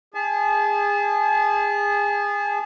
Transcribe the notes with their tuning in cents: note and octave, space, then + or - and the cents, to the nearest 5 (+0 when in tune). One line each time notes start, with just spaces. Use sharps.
G#4 -25 A5 -35